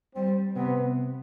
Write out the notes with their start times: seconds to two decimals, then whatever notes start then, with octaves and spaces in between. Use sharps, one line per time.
0.15 G3 C4
0.56 C3 B3